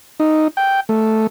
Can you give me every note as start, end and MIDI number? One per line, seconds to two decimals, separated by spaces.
0.20 0.48 63
0.57 0.80 79
0.89 1.27 57